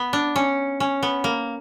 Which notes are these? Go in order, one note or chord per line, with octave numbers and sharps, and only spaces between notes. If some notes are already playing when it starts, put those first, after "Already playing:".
Already playing: B3
D4
C#4
C#4
B3
A#3